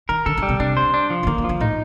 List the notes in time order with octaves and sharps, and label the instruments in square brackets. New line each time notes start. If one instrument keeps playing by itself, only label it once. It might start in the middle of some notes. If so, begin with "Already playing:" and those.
[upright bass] D#3 [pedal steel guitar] A#4
[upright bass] D3 [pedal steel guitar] A4
[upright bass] D3
[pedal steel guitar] G3
[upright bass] C3
[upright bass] C3 [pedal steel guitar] D4
[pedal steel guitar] C5
D4
F3
[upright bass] C3
[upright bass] D3 [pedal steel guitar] A#3
[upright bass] D#3
[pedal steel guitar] F3
[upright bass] D3
[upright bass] A2 [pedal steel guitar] D#4